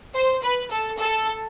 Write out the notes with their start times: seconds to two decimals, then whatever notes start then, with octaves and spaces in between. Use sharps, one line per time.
0.15 C5
0.43 B4
0.71 A4
1.00 A4